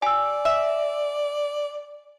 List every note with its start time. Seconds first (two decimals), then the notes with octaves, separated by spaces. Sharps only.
0.02 G4 D5 G#5 E6
0.45 E5